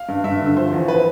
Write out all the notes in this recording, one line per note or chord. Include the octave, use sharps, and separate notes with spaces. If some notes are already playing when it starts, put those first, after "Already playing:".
Already playing: F5
G2
G2 E5
D3
F3 C5
E2
B4